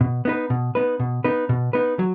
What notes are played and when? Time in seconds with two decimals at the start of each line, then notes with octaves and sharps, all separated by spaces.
0.01 B2
0.25 B3 D#4 B4
0.50 B2
0.75 B3 D#4 B4
1.00 B2
1.24 B3 D#4 B4
1.49 B2
1.73 B3 D#4 B4
1.99 F#3